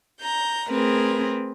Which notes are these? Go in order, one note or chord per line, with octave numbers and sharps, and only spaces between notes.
A#5 G6
A3 C4 G#4 A#4 B4